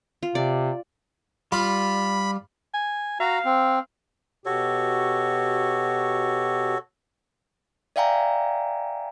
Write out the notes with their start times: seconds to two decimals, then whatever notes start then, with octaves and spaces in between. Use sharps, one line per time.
0.23 F4
0.35 C3 D5
1.52 G3 F4 B5
2.74 G#5
3.20 F#4 F5 A#5
3.45 C4
4.46 B2 F#4 G4 A4 C#5
7.96 D5 E5 F5 G5 G#5 A#5